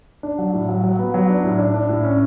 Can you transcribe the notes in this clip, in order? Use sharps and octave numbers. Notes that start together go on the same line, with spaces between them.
D4
F#3
A2
F#3
F#3
B3
F#3
D4
A2
D4
D4
A2
C#4